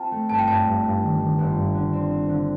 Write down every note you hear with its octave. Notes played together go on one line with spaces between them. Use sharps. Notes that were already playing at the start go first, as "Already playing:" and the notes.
Already playing: C4 F4 G5 A5
A3
G1 A5
G5
G2 A5
G2
G2
D#3
D#3
G1
G2
D3
C4
C4
D3